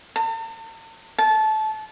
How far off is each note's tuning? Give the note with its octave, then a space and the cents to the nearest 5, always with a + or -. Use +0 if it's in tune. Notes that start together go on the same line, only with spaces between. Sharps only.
A5 +45
A5 -20